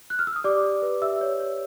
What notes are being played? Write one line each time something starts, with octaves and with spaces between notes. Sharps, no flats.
F#6
F6
E6
D#6
G4 D5 D6
D5
B4
G4 E5 E6
C#5
C#5